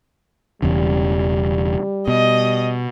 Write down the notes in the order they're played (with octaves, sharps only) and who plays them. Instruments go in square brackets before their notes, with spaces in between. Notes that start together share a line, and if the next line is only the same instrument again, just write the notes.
[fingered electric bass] E1 E2 C#3 [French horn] G3
[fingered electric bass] B2 [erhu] D#5